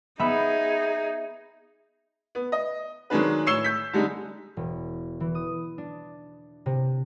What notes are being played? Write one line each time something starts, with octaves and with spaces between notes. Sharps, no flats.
B3 D#4 G#4 E5 B5
B3
D#5
D#3 F#3 G#3 D4 B4
A2 C#5 E6 C7 E7 G7
G6 B6
D3 G3 G#3 D#4
E1
E3
D#6
D4
C3